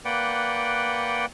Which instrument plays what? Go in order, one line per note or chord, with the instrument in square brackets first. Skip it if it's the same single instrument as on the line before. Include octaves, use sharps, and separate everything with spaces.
[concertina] A#3 B4 D5 F#5 G5